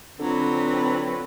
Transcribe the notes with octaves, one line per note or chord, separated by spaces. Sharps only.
D3 F#3 C4 F4 B4